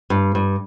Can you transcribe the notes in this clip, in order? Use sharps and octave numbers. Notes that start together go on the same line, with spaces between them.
G2
G2